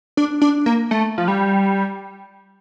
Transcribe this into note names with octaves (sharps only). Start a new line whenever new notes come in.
D4
D4
A#3
A3
F3
G3